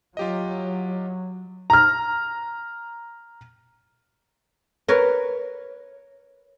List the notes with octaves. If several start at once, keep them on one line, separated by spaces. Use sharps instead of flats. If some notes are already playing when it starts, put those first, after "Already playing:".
F#3 F4 G4 D#5
A#5 F6
A#4 B4 C#5